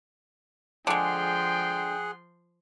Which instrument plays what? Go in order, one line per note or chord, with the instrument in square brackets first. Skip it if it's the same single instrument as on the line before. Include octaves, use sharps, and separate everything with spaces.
[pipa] D3 G#3 [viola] F3 C6 [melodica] G#4 F#5 [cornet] G5